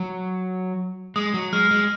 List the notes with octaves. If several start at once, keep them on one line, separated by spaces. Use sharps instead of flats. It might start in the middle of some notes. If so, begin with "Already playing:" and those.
Already playing: F#3
G#3 D#6
F#3
G#3 F6
G#3